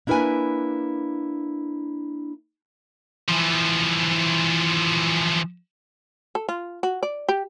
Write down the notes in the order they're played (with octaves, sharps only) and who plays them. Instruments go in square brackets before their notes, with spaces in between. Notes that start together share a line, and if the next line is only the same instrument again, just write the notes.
[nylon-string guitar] A#3 D4 E4 A#4 B4 G#5
[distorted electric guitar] E3 F3
[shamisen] A4
F4
F#4
D5
G4